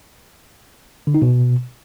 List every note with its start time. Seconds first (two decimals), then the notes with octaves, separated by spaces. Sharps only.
1.07 D3
1.14 D#4
1.22 B2